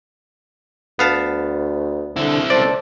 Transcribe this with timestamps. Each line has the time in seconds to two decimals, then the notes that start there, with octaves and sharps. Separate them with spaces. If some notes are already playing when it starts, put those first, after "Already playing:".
0.99 D2 B3 F5 A5
2.16 D3 C4 E4
2.50 C#2 A4 C5 D5